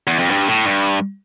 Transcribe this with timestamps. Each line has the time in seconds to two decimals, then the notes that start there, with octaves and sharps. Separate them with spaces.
0.07 E2
0.19 F2
0.31 G2
0.48 A2
0.65 G2